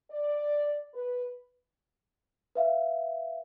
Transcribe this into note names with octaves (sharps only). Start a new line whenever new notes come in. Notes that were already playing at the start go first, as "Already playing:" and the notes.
D5
B4
B4 E5 F5